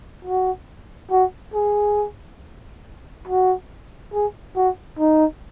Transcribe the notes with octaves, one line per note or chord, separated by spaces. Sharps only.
F#4
F#4
G#4
F#4
G#4
F#4
D#4